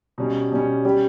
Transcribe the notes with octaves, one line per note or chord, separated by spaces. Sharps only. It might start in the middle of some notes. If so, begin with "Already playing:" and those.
B2 G3 C#4
B2 G3 C#4
G3 C#4 G4